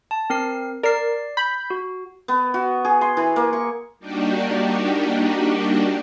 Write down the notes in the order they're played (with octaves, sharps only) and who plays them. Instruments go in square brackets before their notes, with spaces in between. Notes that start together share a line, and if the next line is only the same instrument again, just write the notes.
[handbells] A5
C4 A#4 C7
[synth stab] A#4 [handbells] D5 C7
[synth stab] B5 [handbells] G6
[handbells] F#4
[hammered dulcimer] B3
F#4
G#4
C6
E3
A#3
C#6
[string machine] G3 A#3 D4 D#4 F#4 G4